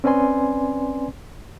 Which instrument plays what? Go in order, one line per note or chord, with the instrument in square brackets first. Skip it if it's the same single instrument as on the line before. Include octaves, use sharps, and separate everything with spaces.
[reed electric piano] C4 C#4 B4 D5 G#5 C6